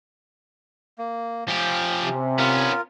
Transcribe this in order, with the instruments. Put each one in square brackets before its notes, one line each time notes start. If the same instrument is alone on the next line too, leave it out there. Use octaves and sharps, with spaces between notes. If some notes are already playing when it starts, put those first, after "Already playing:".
[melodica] A#3
[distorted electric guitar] F3 G4 [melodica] C#4
[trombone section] C3
[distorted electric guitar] B3 C#4 [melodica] F4 A#4